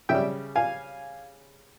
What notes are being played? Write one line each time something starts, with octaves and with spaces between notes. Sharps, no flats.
C#3 E5 G5
G3
F5 G#5